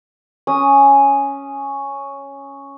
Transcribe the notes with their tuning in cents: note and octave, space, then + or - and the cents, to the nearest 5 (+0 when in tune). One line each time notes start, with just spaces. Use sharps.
C#4 +0 D#6 +0